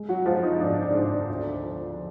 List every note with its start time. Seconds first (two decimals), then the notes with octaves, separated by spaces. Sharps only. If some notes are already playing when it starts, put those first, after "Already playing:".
Already playing: G#3
0.09 F#3 F#4
0.26 F3 G#3 F4
0.43 D#4
0.60 G#2 D4
0.82 D4
0.94 G#2
1.05 D4
1.28 D2
1.63 F3